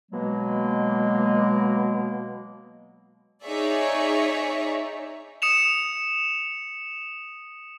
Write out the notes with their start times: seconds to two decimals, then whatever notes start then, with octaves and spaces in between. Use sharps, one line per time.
0.12 B2 F#3 G#3 A#3
3.44 D#4 G#4 C#5 D5 E5
5.42 D#6 C#7 E7 F7